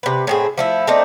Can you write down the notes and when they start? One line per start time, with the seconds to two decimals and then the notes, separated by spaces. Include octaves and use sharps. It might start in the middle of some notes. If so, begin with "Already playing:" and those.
0.03 C3 B4
0.27 A2 C4 G#4
0.58 F3 A3 E4
0.87 A3 C4 D4 D#4